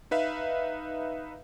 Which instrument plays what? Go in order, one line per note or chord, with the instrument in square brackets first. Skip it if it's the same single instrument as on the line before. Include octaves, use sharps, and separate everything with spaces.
[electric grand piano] D#4 B4 E5 F5